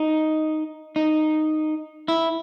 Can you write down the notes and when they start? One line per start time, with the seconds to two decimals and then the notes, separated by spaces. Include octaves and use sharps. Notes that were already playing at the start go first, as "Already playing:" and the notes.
Already playing: D#4
0.96 D#4
2.08 E4